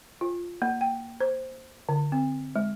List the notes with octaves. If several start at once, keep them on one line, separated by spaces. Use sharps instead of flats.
F4
A#3
G5
C5
D3
C4
G#3